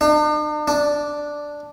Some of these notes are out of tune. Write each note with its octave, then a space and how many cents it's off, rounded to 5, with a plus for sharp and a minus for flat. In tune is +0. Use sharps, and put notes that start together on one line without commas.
D4 +45
D4 +0